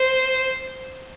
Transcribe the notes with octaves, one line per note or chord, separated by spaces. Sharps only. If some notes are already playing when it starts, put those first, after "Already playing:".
Already playing: C5